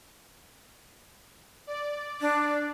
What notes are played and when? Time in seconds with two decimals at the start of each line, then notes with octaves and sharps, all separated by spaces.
1.67 D5
2.21 D4